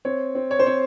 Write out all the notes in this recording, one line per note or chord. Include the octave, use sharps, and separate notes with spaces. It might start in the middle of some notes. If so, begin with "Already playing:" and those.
C4 C#5
C4
C#5
C5
C4 C#5